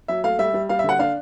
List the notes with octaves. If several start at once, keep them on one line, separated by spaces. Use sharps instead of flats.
F#3 E5
A3 F5
G3 E5
G3
G3 F5
E5
D3 F#5
D4 F5